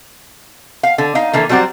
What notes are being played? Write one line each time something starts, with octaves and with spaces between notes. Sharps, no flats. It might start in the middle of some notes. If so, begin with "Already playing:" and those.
F5
D3
D#4 F5
D3 E3 A#3
F#3 G3 C4 F#4 D5